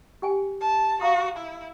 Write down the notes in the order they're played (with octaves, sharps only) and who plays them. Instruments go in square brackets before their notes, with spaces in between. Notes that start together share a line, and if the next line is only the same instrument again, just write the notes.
[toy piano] G4 G5 G#5
[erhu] A5
[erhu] F#4 [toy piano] F5 A#5 D#6
[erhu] E4